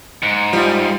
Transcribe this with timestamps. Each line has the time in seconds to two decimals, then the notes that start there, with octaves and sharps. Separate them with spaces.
0.23 G#2
0.53 F3 G3 D#4